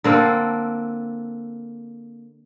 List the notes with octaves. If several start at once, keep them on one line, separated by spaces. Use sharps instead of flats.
D3 A#3 C4 A4